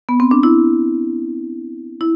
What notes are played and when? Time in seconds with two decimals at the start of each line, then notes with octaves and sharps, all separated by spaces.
0.09 B3
0.20 C4
0.31 D4
0.43 E4
2.01 E4